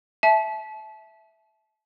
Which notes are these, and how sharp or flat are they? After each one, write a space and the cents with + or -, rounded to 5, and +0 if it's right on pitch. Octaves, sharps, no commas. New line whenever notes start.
E5 +0 A5 -30